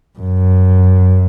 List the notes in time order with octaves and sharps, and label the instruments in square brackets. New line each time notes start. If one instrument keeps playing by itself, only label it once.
[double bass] F#2